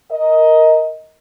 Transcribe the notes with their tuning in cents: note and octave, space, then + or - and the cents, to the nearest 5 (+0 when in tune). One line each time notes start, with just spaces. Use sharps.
A#4 +0 D#5 +15